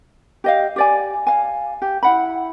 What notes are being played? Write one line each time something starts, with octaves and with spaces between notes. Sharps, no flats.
G4 D#5 F5
G4 D5 G#5
F5 G#5
G4
E4 F#5 B5